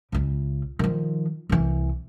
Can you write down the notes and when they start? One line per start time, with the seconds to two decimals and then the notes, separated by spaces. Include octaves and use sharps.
0.12 C#2 C#3
0.79 D#3 F3
1.49 C2 E3